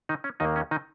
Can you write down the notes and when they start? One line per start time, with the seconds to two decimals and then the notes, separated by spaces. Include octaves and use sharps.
0.09 D#3 D#4
0.24 C#4
0.40 D#2 D#3 A#3 D#4
0.56 C#4
0.71 D#3 D#4